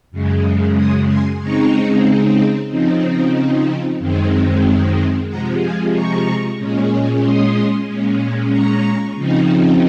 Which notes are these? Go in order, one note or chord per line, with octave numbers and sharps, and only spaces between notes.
F#2 C#3 G#3
C6 D#6
G#5 C6
C#3 G#3 C4 D#4 A#5 C#6
C#3 F3 C4 D#4
F#2 D#3 G#3 C4
C3 F3 G#3 F#5 A#5
F5 G#5
A#5 C#6
A#2 G#3 C#4
C6 D#6
A#2 G#3 C#4
A#5 C#6
C#3 F3 C4 D#4